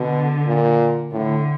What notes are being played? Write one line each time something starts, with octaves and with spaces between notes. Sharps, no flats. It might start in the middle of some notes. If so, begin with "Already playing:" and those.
Already playing: B2 D3
A#2
A2 D3